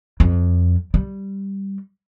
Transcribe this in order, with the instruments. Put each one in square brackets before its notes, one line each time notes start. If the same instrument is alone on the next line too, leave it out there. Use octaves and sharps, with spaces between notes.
[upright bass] F2
G3